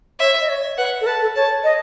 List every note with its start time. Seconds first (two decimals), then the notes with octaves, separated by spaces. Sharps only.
0.20 C#5 E5
0.40 D#5
0.49 C#5
0.78 B4 F#5
1.01 A4
1.07 B4 A5
1.22 A4
1.36 C#5 A5
1.64 D#5